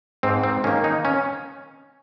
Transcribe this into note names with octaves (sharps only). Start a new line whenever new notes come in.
G#2 C4
C4
D#3 A#3 C#4
D#4
C#4